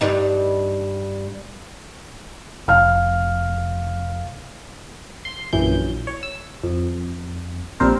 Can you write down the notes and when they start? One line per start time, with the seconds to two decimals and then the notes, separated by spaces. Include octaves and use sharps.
0.01 G2 G3 D#4
2.68 F1 F5 F6
5.25 C6
5.53 A#1 F#2 E3 G6
6.07 C#5
6.23 E6
6.63 F2
7.80 A#1 A#2 G3 C4 A#4 C5